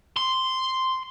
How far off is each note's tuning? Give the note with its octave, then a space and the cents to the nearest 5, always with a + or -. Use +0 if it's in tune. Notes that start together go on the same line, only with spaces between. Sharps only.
C6 -5